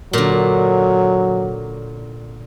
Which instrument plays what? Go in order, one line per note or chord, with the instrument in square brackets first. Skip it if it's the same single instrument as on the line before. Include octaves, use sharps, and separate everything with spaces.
[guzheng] A#2 D3 [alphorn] F#3